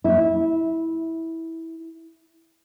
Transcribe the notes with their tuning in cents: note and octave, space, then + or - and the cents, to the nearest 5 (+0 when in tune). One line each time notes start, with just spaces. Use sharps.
E4 -15